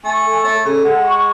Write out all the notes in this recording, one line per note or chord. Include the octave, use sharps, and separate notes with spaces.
A3 G#5
A4
A3 C#5
C#3 A4
G#3 F#5
C#6